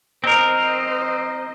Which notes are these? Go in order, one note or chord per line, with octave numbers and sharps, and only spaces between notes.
C4 A#4 C5 D#5